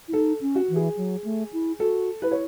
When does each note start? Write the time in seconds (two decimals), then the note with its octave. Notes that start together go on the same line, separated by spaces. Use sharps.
0.08 E4
0.13 D#4 A4
0.41 C#4
0.55 F#4
0.70 E3
0.76 G#4
0.97 F#3
1.24 A3
1.53 E4
1.80 F#4 A4
2.22 E4 B4
2.31 C#5